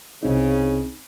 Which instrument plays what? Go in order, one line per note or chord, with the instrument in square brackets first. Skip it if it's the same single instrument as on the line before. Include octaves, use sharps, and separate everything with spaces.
[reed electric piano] C2 C4 D#4 [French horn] C#3